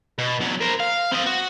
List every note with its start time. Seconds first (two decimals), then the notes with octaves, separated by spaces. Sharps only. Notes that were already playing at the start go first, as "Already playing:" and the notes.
0.19 B2
0.41 E2 F#3
0.61 A#4 C5
0.80 F5
1.12 C4 D#5
1.26 F#4